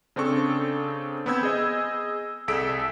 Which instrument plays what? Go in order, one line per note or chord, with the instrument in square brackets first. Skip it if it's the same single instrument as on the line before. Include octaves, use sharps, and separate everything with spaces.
[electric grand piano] C#3 C4 D4 A4 C#6
B3 C4 B5 E6 G6 G#6
G#4 D#5
C2 G#4 A4 E6 B6 D7